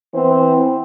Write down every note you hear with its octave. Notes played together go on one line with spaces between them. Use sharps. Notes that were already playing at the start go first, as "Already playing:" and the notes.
E3 B3 C4 C5